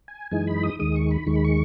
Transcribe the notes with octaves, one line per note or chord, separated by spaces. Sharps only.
G#5
F#2 E3 G#3 D#4 G#5
B5
D#6
D#2 D#3 G#3 D#6
C#6
B5
D#2 D#3 G#3 C#6
B5
C#6